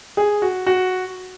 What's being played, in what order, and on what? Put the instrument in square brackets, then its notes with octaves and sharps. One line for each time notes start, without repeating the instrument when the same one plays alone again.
[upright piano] G#4
F#4
F#4